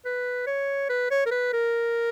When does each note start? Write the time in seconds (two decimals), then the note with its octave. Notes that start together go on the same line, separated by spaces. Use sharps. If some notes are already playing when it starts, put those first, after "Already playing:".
0.05 B4
0.47 C#5
0.89 B4
1.11 C#5
1.26 A#4
1.31 B4
1.53 A#4